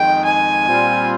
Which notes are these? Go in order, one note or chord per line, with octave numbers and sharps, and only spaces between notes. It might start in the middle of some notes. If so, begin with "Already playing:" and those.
Already playing: F2 D#3 G#3 G5
G#5
A#2 G3 C4 F4